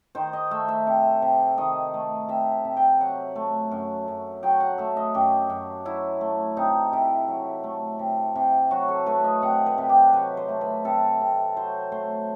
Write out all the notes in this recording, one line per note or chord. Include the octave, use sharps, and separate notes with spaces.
D#3 C5
D#5
A3 E5
E5
C3
C3
D#3 D#5
A3
C3 E5
C3
G5
F#3 F#5
A3
F#2
F#2
F#3 G5
F#5
A3 E5
D#5
F#2 G4
F#2
F#3 E4
A3
C3 D#4
C3 E4
F#3
A3
C3
C3
F#3 F#4
A4
A3 B4
D#5
C3 F#5
B4
C3
G4
F#3 B4
C5
A3
B4
C3 A4
C3
F#3 C5
A3 C5